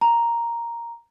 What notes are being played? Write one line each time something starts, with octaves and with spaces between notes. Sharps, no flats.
A#5